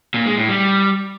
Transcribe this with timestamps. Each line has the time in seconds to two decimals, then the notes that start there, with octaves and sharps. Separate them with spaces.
0.14 A#2
0.26 G#3
0.37 A2
0.49 G3